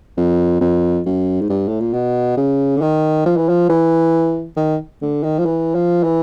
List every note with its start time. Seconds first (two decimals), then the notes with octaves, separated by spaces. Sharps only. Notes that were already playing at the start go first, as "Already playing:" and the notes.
0.17 F2
0.61 F2
1.06 F#2
1.41 G#2
1.49 G2
1.68 A2
1.80 A#2
1.93 B2
2.37 C#3
2.76 D3
2.81 D#3
3.26 F3
3.37 E3
3.49 F3
3.69 E3
4.57 D#3
5.02 D3
5.23 D#3
5.39 F3
5.45 E3
5.75 F3
6.04 E3